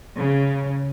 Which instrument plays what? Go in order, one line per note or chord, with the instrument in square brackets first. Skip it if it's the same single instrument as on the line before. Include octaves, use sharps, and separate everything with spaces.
[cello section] C#3